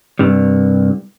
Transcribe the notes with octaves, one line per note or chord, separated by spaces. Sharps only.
C2 G2